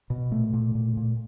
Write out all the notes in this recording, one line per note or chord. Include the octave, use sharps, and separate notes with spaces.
B2
A#2 A3
A#2
A#2
A#2